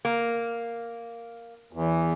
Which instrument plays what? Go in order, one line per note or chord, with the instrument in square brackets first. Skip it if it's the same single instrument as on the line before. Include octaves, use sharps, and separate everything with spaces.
[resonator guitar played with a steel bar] A#3
[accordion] E2